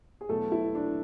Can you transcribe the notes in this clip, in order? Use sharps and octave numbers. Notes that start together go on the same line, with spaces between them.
G#4
E2 B2 F#3 A3 A4
E4
D4